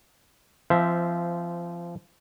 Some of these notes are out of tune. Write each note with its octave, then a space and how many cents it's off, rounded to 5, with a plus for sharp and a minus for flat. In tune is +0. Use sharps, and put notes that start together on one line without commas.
F3 -25 C4 -10 E5 +0